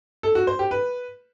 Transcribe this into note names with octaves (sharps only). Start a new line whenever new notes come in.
A4
F#4
C5
G4
B4